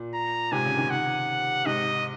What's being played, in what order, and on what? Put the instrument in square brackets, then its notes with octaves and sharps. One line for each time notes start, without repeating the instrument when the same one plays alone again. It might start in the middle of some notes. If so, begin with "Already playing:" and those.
Already playing: [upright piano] A#2
[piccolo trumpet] A#5
[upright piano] G#2 C3 [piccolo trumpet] G#5
[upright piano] C#3
C3 D#3
[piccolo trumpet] F#5
[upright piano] G#2 C3 [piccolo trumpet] D#5